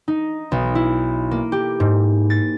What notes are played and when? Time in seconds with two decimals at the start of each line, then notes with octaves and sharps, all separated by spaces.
0.08 D#4
0.52 B1
0.75 E4
1.31 A#3
1.52 G4
1.80 G#2
2.30 A6